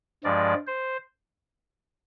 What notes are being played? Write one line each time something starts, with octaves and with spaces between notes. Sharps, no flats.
G2 F3 G#3 D5
C5